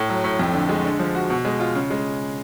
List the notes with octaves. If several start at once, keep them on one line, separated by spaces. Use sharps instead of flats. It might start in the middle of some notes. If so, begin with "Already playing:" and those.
Already playing: A2
F#3
A2
F2
D3
G#3
D3
F3
F#4
B2
G#3
F4
C#3
G#3